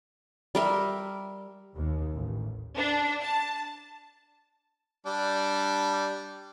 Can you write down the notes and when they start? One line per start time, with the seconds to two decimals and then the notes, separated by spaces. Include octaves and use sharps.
0.55 G3 A#4 E5
1.75 D#2
2.15 A1
2.76 D4
3.22 A5
5.06 G3 D4